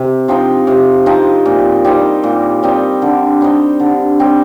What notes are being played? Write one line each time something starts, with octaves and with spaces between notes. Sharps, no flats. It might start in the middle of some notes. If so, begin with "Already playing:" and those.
Already playing: C3
F3 C4 D#4
C3
F3 C4 D#4
A#2
G3 C4 D#4
A#2
G3 C4 D#4
D3
G3 C4 D#4
D3
G3 C4 D#4